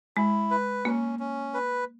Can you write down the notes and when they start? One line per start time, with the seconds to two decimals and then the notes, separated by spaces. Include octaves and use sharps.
0.17 G#3 E4
0.51 B4
0.85 A#3 C#4
1.19 C#4
1.54 B4